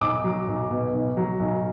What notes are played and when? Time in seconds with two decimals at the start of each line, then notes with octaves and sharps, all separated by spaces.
0.01 B1 D6
0.24 F#3
0.48 B1
0.71 B2
0.94 B1
1.17 F#3
1.40 B1